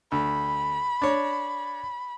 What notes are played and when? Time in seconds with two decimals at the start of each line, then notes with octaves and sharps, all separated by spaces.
0.12 D2 B5
1.02 D4 C#5